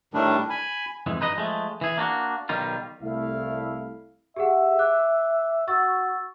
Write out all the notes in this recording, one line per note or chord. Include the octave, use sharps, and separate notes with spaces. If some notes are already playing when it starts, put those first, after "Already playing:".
A2 D#3 G3 A3 D4
G#5 B5
F2 G#2 E3 G#3
G2 D#4 B4 C5 D#5
F3 G#3 A3
E3 G#4
A#3 D4 F#4
B1 D#3 G3 F4
C2 A3 E4 F5
G4 G#4 E5 F#5
D6 F#6
F#4 C#6 E6 A6